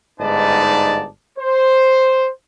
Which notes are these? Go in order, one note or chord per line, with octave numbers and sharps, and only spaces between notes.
G1 G#2 D#4 B4 D5 A5
C5